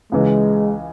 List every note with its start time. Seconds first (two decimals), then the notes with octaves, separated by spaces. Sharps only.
0.12 C#2 C#3 E3 G#3